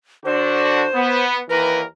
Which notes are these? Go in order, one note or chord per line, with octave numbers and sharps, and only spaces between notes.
D3 D4 F#4 C5
B3
D#2 E3 A#4 B4